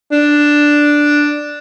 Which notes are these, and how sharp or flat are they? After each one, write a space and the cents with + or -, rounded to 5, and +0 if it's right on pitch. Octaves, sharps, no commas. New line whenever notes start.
D4 +0